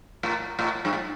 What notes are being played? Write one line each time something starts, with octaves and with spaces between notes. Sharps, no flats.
A2
A2
G2
A2